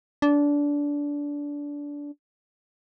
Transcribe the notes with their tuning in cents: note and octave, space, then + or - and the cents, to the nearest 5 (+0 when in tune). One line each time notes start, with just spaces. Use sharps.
D4 -20